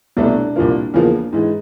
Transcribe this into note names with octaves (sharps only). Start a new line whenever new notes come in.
C2 B2 F#3 A3 D4
C2 A#2 F3 A#3
E2 C#3 F3 A#3
G#2 E3 G#3